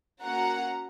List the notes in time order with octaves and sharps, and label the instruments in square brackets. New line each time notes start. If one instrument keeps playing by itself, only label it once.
[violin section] A#3 C#4 F#4 F#5 A#5